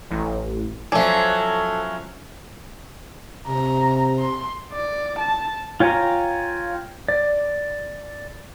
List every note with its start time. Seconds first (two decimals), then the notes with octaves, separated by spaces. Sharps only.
0.10 A1
0.92 F3 F#3 C#4 A4 D5 E5 G#5
3.48 C3 A#5
4.19 C6
4.72 D5
5.19 A5
5.80 F4 C#5 G5 G#5 A#5
7.08 D5